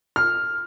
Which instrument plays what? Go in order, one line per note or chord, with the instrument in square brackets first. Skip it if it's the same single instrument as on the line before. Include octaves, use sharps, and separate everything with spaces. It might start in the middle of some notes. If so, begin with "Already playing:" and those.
[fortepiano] F6